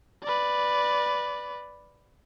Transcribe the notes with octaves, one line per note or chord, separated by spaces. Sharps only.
B4 D5